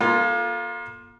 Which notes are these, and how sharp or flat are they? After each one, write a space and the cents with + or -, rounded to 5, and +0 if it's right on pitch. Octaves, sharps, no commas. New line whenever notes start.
A#3 +35 F4 +0 A4 +0